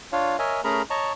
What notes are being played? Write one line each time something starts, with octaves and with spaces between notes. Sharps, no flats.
D4 F4 C#5 F5
A#4 C#5 D#5 E5 G#5
A3 C#4 G#4 A#4 A#5 B5
C#5 D#5 A5 A#5 C#6